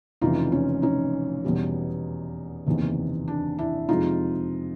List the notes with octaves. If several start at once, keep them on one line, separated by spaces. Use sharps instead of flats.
F1 F2 C#3 E3 D#4 F4
C#4
C#4 D#4
E2 B2 G3
F#1 E2 C3 D#3
D4
D4 E4
F2 C3 F3 G#3 D#4 F4